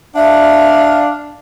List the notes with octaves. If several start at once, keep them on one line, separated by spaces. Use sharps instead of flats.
D4 E5 F5